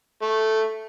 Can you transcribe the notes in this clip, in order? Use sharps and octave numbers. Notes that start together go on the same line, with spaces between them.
A3